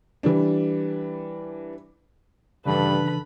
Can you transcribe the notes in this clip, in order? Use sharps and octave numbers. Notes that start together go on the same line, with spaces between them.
E3 G3 D4
G2 C#3 E3 D4 A4 B4 B5